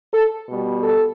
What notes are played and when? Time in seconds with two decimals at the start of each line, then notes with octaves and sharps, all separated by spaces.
0.13 A4
0.47 B2 G3
0.81 A4